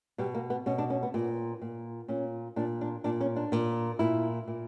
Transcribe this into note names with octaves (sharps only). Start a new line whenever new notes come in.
B2 G3
A#3
B3
B2 C#4
D4
C#4
B3
A#2
A#2
A#2 C#4
A#2 D4
D4
A#2 D4
C#4
D4
A#2
A#2 E4
A#2